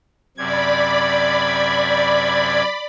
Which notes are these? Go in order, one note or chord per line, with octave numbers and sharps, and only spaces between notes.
F#2 C3 D5 B5 G#6